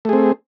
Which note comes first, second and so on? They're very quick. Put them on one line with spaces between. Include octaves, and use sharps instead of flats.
A3 G#4 C4